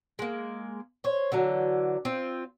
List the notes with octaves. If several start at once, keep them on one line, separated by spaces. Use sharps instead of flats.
G#3 A#3
C5 C#5
D3 E3 F#3
C4 F4